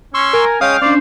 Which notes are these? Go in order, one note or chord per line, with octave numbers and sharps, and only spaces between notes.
C#4 C6 C#6 E6
A#4 G#5
G#3 C#4 F5 G5 D#6
C#4 D4 C5 D5